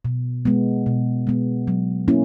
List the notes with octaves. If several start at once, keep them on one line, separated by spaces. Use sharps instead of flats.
B2
G#3 B3
B2
G#3 B3
F#3
A#3 C#4 E4